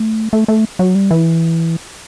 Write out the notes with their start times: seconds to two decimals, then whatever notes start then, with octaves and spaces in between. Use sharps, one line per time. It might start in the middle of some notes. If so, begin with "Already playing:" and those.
Already playing: A3
0.33 A3
0.48 A3
0.79 F#3
0.95 G3
1.11 E3